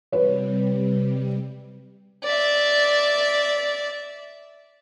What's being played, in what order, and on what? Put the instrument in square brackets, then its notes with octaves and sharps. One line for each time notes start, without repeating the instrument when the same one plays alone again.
[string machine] C3 G3 [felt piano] B4 C#5
[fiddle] D5 E5